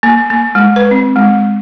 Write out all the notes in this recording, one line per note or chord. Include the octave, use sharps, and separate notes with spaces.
A#3
A#3
G#3
B4
C4
G#3